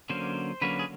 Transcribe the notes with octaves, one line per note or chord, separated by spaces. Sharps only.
D3 F#3 A#3 C#4 C5
D3 F#3 A#3 C#4 B4
G#4